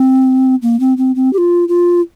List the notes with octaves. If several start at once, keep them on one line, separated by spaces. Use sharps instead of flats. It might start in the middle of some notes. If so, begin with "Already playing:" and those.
Already playing: C4
A#3
C4
C4
C4
G4
F4
F4